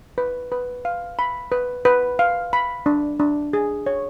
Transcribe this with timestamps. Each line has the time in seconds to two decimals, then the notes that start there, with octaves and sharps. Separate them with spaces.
0.18 B4
0.52 B4
0.85 F5
1.19 B5
1.52 B4
1.85 B4
2.19 F5
2.53 B5
2.86 D4
3.20 D4
3.53 G#4
3.86 C#5